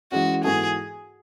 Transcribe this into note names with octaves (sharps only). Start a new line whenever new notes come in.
E3 G#3 C#4 F#4
G#2 E3 B3 F#4 G#4 A4